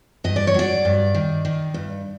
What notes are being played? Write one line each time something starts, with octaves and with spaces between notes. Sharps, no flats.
G2 D#5
D5
C#5
F#3 D5
G2
D#3
D#3
G2